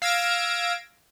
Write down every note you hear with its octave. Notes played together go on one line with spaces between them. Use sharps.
F5 E6 G#6 A#6 D7